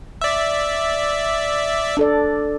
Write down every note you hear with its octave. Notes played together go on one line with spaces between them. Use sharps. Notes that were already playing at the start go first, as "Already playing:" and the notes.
D5 E5
D4 A4 D5